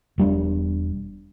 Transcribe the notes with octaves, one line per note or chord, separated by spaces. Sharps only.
E1 G3 D4